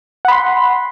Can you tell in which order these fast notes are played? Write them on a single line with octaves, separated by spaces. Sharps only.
F#5 B5 C6